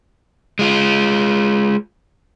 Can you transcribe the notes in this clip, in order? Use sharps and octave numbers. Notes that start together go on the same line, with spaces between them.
G#3 F4